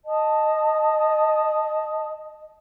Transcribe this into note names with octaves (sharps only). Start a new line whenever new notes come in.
D#5 A5 D#6